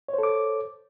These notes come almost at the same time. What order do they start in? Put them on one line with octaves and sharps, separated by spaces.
C#5 C5 A4 D6